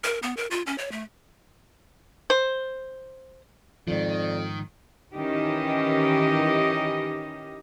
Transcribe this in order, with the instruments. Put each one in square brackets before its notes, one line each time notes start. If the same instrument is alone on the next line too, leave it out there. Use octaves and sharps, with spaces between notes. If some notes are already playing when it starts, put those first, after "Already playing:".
[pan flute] A#4
B3
A#4
F4
C#4
C#5
A3
[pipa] C5
[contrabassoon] F2 [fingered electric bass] G#2 F3 [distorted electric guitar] D#3 [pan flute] D5
[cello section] D#3 E3 C#4 D#4 G4 D#5